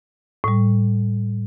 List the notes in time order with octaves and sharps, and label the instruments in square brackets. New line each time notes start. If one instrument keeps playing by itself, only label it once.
[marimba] A2 G3